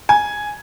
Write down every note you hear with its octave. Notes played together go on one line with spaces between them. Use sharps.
G#5